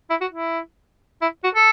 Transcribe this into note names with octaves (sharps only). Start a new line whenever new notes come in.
E4
F#4
E4
E4
F#4
A4